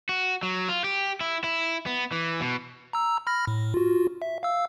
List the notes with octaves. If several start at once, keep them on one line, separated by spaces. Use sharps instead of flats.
F#4
F#3
F4
G4
E4
E4
B3
E3
B2
A#5 E6
B5 F6 A#6
A2
F4 F#4
E5
F5 E6